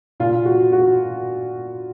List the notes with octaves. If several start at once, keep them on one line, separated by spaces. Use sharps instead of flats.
A#2 F4
F#4
F#4